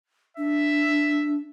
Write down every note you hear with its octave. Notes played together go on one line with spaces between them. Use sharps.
D4 E5